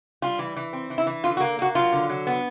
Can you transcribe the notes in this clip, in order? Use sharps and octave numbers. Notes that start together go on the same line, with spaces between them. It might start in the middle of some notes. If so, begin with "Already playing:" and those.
G3 F4
E3
E3
C4
E3
E4
E3
D3 F4
F#4
A#3
A#3 F#4
F#3 F4
D3
F#3
B3